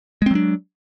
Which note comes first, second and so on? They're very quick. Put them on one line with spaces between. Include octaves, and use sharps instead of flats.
G#3 C4 F#3 D4